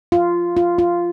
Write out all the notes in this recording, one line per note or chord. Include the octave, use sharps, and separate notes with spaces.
F4
F4
F4